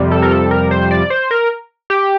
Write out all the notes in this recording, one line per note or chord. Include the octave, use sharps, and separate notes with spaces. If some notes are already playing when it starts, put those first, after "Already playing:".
Already playing: F2 C3 G3
A4
A#4
A4
A#4
C5
D5
C5
A#4
G4